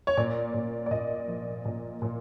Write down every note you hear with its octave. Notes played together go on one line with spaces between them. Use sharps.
C#5
A#2 D5
A#2
D5
A#2 D#5
F3
A#2
A#2